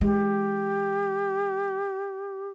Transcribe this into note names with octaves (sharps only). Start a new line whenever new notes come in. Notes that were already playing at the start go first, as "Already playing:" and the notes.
E3 G#3 G4